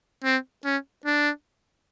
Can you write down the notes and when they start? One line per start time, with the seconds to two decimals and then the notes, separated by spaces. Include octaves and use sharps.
0.24 C4
0.64 C#4
1.05 D4